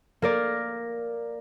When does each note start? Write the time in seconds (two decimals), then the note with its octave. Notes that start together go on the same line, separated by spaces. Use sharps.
0.22 A#3 A#4 D5